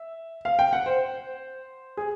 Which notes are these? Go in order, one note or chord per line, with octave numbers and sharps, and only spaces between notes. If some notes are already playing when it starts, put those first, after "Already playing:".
Already playing: E5
F5
G5
F#5
C5
G#4